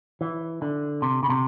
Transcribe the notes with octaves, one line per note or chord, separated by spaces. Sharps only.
E3
D3
C3
C#3
C3